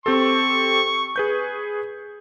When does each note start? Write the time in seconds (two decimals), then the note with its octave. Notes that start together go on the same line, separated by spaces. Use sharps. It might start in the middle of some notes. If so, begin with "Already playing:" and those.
0.06 C4 G4 A4 C#6
1.16 G#4 B4 G6